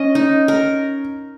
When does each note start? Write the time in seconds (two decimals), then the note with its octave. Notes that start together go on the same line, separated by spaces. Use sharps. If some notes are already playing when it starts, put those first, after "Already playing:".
Already playing: C#4 D#5
0.15 D#4
0.48 A#4